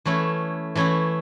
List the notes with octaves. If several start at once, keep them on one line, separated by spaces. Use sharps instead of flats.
E3 A3 C#4 E4
E3 A3 C#4 E4